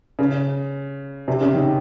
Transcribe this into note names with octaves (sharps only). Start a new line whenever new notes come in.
C#3
C3
C#3
D#3